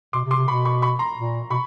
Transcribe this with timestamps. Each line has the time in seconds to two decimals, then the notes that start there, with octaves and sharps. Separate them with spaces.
0.13 B2 C6 D6
0.25 C3
0.31 C6 D6
0.36 C3
0.48 B2 B5 C#6
0.65 B5 C#6
0.82 B5 C#6
0.99 A#5 C6
1.17 A#2
1.50 B2 B5 C#6